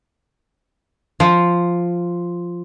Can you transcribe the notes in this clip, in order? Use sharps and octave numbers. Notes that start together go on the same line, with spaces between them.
F3